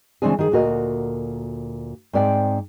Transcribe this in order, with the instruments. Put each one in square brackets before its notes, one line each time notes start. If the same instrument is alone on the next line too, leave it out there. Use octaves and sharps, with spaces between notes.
[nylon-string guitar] C#3 E3 G#3 C4 D4 G#4
D#3 G#4
D2 A#2 F#4 A#4 D#5
G#2 C4 D5 G5